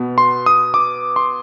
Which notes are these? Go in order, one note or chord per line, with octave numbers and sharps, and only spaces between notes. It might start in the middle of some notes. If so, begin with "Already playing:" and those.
Already playing: B2 B3
C6
D#6
D6
C6